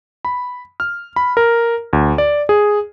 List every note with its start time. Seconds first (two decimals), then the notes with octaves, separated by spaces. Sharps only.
0.25 B5
0.80 F6
1.16 B5
1.37 A#4
1.93 D2
2.18 D5
2.49 G#4